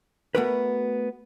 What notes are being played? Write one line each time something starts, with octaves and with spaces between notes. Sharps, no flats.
A3 B3 D4 F#4 A#4 B4